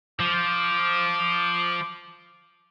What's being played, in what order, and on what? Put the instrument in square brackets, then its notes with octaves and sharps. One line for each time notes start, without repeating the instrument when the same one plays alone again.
[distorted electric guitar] F3 [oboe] D6